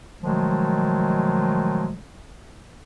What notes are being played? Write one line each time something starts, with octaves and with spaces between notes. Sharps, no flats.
B2 D#3 F3 F#3 G#3 A3